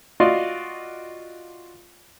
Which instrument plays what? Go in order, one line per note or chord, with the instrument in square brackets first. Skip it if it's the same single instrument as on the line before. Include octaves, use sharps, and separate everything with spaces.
[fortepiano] F4 F#4 D5 D#5 F5 C6